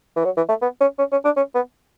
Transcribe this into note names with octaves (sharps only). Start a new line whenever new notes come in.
E3
F#3
E3
A3
B3
C#4
C#4
C#4
D4
C#4
B3